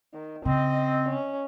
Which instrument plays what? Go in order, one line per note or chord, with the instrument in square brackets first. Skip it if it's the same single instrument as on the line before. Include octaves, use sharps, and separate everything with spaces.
[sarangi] D#3
[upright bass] C#3 [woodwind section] C4 [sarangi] D#5
[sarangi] C#4